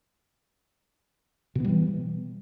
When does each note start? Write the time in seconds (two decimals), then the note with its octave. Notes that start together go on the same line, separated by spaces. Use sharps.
1.55 B2
1.60 B3
1.65 G3
1.69 E3